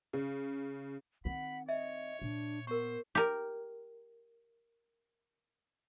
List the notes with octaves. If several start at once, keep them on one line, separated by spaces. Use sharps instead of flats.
C#3
D#3 C4 F#5 B5
C#5 D#5 E5
A#2 D4
B3 A#4 C5 C#6
G4 A#4